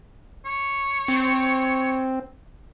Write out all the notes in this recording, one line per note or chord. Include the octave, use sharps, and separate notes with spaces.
C#5
C4